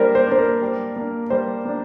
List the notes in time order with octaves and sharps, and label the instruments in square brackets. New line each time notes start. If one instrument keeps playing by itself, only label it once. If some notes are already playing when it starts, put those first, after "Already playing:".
Already playing: [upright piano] G3 A#3 D4 [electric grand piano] A#4 C5
[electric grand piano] C5
[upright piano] A#3 D4 [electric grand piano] C5
[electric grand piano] A#4
[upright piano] G3
A#3 D4
[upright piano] G3 [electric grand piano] C5
[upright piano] A#3 D4